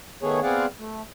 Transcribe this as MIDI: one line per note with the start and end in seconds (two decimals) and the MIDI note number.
0.23 0.40 51
0.23 0.40 57
0.23 0.40 59
0.23 0.40 68
0.23 0.40 73
0.43 0.66 59
0.43 0.66 60
0.43 0.66 68
0.43 0.66 74
0.43 0.66 77
0.43 0.66 78
0.79 1.02 57